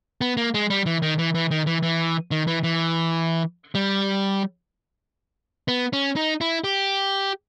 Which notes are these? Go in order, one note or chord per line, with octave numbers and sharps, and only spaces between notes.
B3
A#3
G#3
G3
E3
D#3
E3
E3
D#3
E3
E3
D#3
E3
E3
G3
B3
C#4
D#4
E4
G4